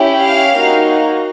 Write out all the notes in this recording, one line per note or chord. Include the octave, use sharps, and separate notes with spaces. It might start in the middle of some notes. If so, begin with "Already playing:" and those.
Already playing: C#4 E4 G4
F5
A#3 D#4 F#4